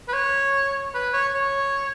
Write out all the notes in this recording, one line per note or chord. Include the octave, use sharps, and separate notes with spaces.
B4
C#5
B4
C#5
C#5